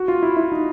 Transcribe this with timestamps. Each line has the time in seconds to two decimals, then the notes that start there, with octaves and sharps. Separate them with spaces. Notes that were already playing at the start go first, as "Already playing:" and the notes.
Already playing: F#4
0.08 F4
0.23 E4
0.37 E4
0.52 D#4